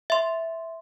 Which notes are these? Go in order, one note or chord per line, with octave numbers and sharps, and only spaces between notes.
E5 C6